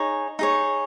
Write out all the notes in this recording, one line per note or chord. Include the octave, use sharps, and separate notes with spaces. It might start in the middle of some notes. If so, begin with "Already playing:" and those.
Already playing: D#4 G#4 C#5
D#4 G#4 C#5